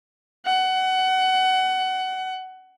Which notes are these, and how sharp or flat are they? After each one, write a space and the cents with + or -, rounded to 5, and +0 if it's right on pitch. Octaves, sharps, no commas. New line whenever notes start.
F#5 +20